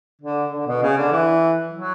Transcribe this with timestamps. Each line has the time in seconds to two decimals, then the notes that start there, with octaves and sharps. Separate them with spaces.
0.22 D3
0.52 D3
0.67 B2
0.82 C#3
0.97 D3
1.12 E3
1.72 F#3